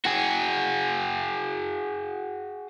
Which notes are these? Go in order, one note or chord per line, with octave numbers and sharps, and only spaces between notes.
F#4 G#4